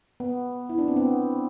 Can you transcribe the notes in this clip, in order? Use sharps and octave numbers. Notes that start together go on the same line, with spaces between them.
B3
E4
D4
C4
B3